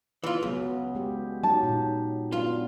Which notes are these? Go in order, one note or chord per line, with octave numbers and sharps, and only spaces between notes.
E3 F4
C#2 F#3 B3 G#4
G#3 G4
F#3 D#4 G4 A5
A#2 D#4
F#3 B3 D4 F4